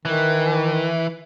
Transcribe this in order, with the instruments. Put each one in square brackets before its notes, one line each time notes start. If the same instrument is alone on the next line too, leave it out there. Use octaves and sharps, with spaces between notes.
[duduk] D#3 [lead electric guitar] E3